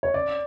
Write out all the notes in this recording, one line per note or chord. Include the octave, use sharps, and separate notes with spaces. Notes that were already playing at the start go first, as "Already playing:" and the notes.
C#5
D5